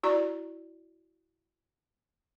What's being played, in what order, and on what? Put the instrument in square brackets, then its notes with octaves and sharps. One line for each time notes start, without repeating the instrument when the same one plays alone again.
[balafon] E4 F#4 D5 A#5